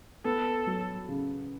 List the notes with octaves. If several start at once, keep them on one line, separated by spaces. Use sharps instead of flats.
B3 A4
F#3
C#3